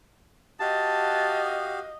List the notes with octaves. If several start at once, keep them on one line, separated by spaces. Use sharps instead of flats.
F#4 G4 D#5 F5 A5